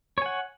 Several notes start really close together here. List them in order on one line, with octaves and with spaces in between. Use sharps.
C#5 G#5 F#5